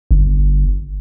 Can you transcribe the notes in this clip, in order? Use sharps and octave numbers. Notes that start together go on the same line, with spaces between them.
G1